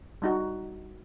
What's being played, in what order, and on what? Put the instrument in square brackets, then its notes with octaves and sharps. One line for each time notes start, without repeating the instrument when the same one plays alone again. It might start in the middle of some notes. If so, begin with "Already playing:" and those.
[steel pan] G3 D#4 F#4